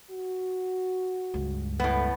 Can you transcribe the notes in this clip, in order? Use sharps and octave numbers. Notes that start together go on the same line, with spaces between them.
F#4
C#2 G2
A2 A3 B3